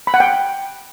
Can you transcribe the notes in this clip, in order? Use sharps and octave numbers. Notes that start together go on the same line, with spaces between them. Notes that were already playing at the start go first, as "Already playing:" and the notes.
B5
F#5
G5